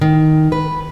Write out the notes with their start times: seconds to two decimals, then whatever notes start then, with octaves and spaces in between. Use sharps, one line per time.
0.01 D#3
0.52 B4